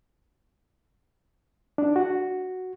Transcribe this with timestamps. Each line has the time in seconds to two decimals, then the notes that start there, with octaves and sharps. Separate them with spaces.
1.78 D4
1.96 F#4